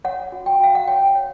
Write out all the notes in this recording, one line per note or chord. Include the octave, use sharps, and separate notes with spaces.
C#5 F#5
F#4
G5
F#4 F5
F#5
C#5 G5
C#5